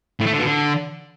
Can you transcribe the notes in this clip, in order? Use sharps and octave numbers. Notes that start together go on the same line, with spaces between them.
A2
A3
D3
B2
D3